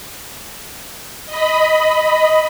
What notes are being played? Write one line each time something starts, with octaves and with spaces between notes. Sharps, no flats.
D#5 B5